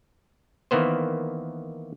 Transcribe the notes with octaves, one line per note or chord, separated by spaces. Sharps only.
D#3 E3 A#3 B3 C5